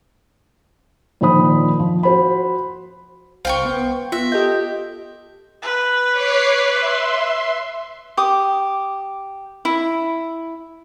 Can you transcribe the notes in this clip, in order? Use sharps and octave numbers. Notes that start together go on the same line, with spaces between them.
A#2 D#3 F3 C5 B5 D#6
F3
F#4 C5 B5
C2 C5 F5 G5 C#6
B3
F4 E5
G4 A4 D#5 G6
B4
C#5 D6 C7
E5 C6
G4 D6 D#6
E4